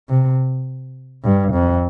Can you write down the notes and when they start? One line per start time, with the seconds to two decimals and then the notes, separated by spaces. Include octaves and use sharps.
0.09 C3
1.24 G2
1.53 F2